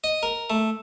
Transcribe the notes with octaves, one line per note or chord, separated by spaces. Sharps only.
D#5
A#4
A3